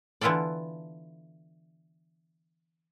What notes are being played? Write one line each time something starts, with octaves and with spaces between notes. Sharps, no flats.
D3 E3 B3 F4 A4 D5